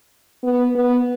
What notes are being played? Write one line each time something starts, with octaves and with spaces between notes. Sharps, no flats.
B3
B3